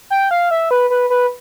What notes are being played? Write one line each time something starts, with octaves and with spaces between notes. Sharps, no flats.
G5
F5
E5
B4
B4
B4